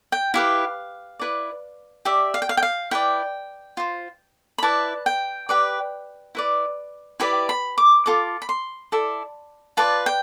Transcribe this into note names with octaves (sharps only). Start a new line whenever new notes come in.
G5
E4 G4 B4 F5
E4 B4 D5
G4 D5 E5
F5
G5
F5
G5
F5
E4 B4 D5 G5
F4 C5
B5
E4 B4 D5 A5
G5
G4 B4 D5
E4 B4 D5
E4 G4 B4 D5 B5
B5
D6
F4 A4 D6
B5
C6
E4 A4 D5
F4 B4 D5 A5
G5